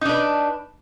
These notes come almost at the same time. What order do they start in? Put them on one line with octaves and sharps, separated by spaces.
D#4 D4 B4